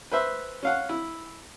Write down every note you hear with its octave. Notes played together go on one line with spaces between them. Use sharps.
B4 C5 E5
C#4 F5 F#5
E4